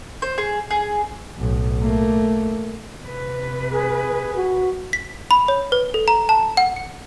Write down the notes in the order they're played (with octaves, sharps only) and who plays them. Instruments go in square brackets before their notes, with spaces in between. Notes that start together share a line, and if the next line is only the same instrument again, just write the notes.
[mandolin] C5
G#4
G#4
[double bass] B1 A2
A3 A#3
[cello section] C3 B4
[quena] G#4
[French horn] F#4
[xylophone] B6
B5
C#5
B4
A4
A#5
A5
F#5
C#7